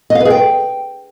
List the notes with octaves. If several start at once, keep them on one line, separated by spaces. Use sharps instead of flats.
D#5
F5
B4
G#4
G5